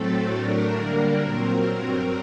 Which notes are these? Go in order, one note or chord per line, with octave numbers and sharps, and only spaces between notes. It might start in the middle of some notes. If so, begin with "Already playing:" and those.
Already playing: A2 F#3 A3 C4 A4
A2 F#3 A3 D4 A#4
D3 G3 A#3 D4
A#2 F#3 C4
G2 F#3 C4